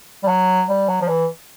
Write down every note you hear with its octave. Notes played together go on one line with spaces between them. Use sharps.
G3
F#3
G3
F#3
F3
E3